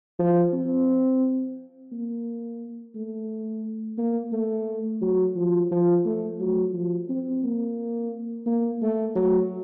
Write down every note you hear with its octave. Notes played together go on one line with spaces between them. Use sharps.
F3
C4
A#3
A3
A#3
A3
F#3
F3
F3
A3
F#3
F3
C4
A#3
A#3
A3
F#3